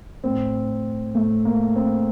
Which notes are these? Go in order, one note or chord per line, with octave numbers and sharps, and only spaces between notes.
A2 C4
A2 A3
A#3
C4